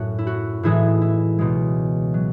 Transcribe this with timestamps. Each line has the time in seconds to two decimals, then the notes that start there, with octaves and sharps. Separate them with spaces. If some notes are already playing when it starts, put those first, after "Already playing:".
Already playing: F#2 A2 F#4
0.18 E4
0.27 F#4
0.63 A2 E3 G#3 E4 G#4
1.02 E4
1.39 C#2 B2 G#3
2.14 F#3